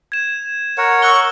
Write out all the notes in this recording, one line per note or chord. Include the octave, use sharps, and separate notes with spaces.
G#6 E7
A#4 C#5 F#5
C#6 E6 F#6 G7